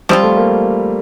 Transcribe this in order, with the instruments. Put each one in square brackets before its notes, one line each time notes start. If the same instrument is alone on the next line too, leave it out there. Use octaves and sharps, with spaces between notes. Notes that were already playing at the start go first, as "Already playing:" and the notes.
[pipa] F3 C4 F4 [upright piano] G3
[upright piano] A3
A#3